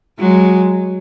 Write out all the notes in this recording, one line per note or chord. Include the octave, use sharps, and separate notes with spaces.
F#3 G#3